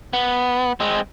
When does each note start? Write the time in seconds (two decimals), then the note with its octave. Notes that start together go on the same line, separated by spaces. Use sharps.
0.13 B3
0.80 G#3 C4